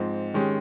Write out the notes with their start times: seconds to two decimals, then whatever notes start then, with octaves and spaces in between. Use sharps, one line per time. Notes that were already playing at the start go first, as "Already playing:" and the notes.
Already playing: G#2 F3 C4
0.34 D#3 G#3 C#4 G4